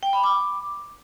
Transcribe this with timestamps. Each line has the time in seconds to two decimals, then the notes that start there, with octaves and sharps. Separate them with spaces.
0.03 G5
0.13 B5
0.24 D6